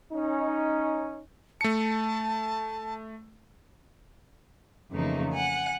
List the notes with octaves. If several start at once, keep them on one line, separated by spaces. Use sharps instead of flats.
C#4 D#4
A3 A5 C#7
F2 C#3 E3 A3 A#3 D#4
F#5 G#5